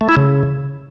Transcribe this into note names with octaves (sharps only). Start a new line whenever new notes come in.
A3
E4
C#3